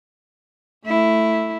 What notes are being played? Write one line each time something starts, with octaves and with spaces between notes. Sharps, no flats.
A3 E4